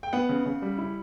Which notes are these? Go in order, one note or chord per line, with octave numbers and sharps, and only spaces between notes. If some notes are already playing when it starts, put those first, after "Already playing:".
G5
B3 F#5
C#3
C#3
G3
E4